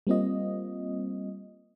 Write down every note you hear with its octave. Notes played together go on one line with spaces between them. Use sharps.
G3 A#3 C4 F4 D#5